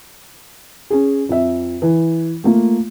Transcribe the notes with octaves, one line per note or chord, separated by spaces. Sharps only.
C#4 G#4
F2 E5
E3
A3 A#3 F4